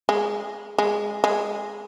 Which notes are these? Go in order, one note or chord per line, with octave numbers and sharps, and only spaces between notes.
G#3
G#3
G#3